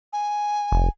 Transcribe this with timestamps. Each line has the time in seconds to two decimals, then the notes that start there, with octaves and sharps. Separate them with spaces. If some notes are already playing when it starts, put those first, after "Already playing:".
0.13 G#5
0.72 F1